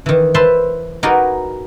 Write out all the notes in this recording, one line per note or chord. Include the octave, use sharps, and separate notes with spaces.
D#3 E3
B4 C5 E5 A5 B5 C6
D#4 F#4 G#4 A#4 B4 D5